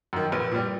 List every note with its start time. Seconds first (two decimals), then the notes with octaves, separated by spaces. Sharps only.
0.13 F#2 D#3
0.32 A#1 B4
0.52 A#2 G3